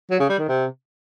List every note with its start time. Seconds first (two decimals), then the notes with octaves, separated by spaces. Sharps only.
0.10 F#3
0.20 C#3
0.29 G3
0.39 D#3
0.48 C3